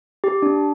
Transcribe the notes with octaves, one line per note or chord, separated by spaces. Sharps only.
G4
D4